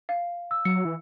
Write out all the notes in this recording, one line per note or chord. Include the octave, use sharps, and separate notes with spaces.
F5
E6
F#3 C#7
E3